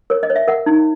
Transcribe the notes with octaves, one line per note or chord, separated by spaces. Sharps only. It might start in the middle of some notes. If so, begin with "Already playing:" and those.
A#4 C#5
D#5
C#5
E5
A#4 F#5
D#4